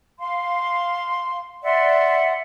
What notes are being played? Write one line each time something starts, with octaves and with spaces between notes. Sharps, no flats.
F5 C6
D5 E5 F#5 C6